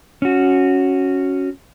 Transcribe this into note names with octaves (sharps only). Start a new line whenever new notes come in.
C#4 F#4